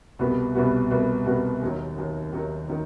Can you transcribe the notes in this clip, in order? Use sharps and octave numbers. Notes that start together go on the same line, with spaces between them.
C2 B2 G3 B3 F#4
C2 B2 G3 B3 F#4
C2 B2 G3 B3 F#4
C2 B2 G3 B3 F#4
D#2 D#3 F#3
D#2 D#3 F#3
D#2 D#3 F#3
D#3 F#3